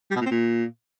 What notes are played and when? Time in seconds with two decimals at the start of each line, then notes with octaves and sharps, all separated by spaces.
0.11 G3
0.16 B2
0.21 A#2
0.26 C4
0.31 A#2